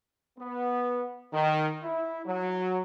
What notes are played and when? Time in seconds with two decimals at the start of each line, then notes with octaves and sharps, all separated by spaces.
0.39 B3
1.33 D#3
1.82 E4
2.26 F#3